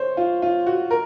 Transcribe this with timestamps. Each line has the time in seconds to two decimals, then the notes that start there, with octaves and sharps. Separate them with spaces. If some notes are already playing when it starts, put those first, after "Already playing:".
Already playing: C5 C#5
0.17 F4
0.42 F4
0.66 F#4
0.91 A#4